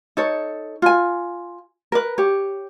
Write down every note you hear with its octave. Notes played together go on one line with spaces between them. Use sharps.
D#4 A4 C#5
F4 G#5
A#4 B4
G4 C#5